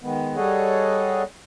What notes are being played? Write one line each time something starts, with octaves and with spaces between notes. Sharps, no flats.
D#3 G#3 B3
G3 G#4 A4 C#5 D#5 F#5